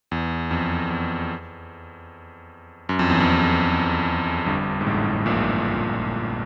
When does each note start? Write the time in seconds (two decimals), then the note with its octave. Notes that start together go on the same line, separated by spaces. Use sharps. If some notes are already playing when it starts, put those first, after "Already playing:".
0.11 E2
0.51 F2
0.90 E2
2.89 F#2
2.99 F2
3.10 E2
3.20 F2
4.46 G1 G2
4.81 G#2
4.87 A1 A2
5.26 A#1 A#2